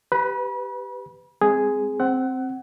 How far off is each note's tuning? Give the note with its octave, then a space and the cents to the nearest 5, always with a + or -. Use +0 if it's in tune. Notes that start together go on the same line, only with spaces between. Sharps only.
G4 +0 B4 +15 B5 -35
G#3 +0 C4 +0 G#4 +0
C4 +0 F#5 +25